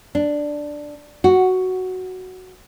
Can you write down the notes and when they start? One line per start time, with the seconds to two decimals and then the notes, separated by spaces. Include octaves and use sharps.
0.15 D4
1.24 F#4